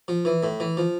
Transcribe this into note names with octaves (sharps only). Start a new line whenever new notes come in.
F3
E3
A2
E3
F3